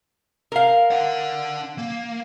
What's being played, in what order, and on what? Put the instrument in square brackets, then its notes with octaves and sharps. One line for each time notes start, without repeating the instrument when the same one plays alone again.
[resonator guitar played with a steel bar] A#4 F5
[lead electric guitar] D4 F#5
A#3